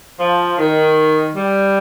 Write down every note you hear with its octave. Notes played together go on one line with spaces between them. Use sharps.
F3
D#3
G3